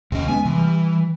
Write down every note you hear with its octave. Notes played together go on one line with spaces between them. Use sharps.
D#2 C3 C#4 D#5
G#3 B3 C#4 G#5
C3 E3
G3